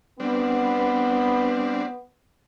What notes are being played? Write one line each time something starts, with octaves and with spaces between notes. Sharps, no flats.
G3 B3 C4 D4